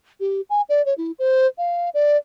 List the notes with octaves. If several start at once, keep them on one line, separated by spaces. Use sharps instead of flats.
G4
G#5
D5
C#5
E4
C5
F5
D5